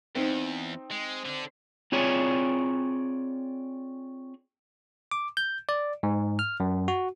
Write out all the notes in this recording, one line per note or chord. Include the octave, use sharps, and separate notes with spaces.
E2 C4 D#4
G#3
D3 D4
C4 F4 G#4 C#5 D5 G#5
D6
G6
D5
G#2
F6
F#2
F#4